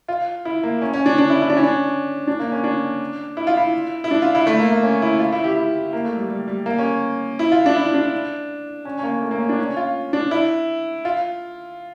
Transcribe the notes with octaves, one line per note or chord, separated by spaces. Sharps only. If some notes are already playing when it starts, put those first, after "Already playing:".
F4
E4
A#3
C#4
C#4
D4
D4
E4
E4
D4
C#4
D4
D4
A#3
C#4
D4
E4
F4
E4
E4
D4
F4
E4
A3
A#3
A#3
C#4
E4
F4
E4
G4
E4
A#3
A3
G3
G3
G3
A#3
C#4
E4
F4
D4
E4
D4
C#4
C#4
A#3
A3
A#3
C#4
D4
C#4
F4
D4
E4
F4